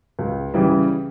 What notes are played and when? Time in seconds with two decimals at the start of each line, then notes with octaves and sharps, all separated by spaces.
0.19 C#2
0.54 C#3 E3 G3